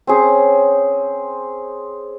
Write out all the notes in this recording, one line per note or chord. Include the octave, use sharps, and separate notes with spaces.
C4 C#4 G#4